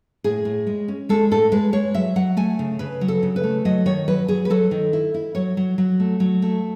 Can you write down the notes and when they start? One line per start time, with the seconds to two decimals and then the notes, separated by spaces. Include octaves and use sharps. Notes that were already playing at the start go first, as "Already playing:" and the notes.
0.24 A2 G#4
0.45 A2
0.67 G#3
0.88 C#4
1.09 G#3 A4
1.31 A2 A4
1.52 G#3 B4
1.73 G#3 C#5
1.95 F#3 E5
2.16 F#3 F#5
2.37 A3 G#5
2.59 C#3
2.79 C#3 B4
3.01 F#3
3.08 A4
3.23 C#3
3.36 B4
3.44 A3
3.65 F#3 D#5
3.86 D#3 C#5
4.08 F#3 B4
4.28 F#3 G#4
4.45 B4
4.50 F#3 A4
4.71 D#3
4.93 E4
5.14 E4
5.35 F#3 C#5
5.57 F#3
5.78 F#3
6.00 A3
6.20 F#3
6.42 A3